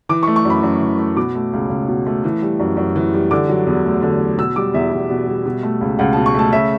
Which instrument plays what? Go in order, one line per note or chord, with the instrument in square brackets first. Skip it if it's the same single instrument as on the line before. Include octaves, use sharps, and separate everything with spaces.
[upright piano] E3 D6
C#6
A3
C#6
F#2
B5
F#2
E3
A3
B2 D6
A3
C#2
C#2
B2
A3
E3
G3
F#2
F#2
E3
G3
D3 D6
F#3
E2
A3
D3
F#3
B2 E6
G3 D6
E2 E5
E2
B2
G3
B2
A3
C#2
C#2 F#5
B2 A5
C#6
A3 A5
C#3 E5